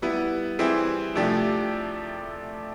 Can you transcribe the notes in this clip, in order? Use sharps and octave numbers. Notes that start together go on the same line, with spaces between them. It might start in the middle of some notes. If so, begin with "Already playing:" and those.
G3 B3 E4
E3 G3 C4 E4 G#4
C3 F3 A3 D4 G4